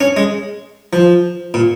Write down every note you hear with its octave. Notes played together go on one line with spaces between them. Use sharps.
C#4
G#3
F3
A#2